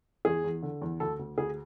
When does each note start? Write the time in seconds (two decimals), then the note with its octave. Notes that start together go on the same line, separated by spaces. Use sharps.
0.25 E2 G#4
0.44 E2
0.63 D3
0.82 E2
1.00 D2 A4
1.19 D2
1.38 D2 G#4